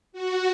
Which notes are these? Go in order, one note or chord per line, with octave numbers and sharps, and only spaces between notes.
F#4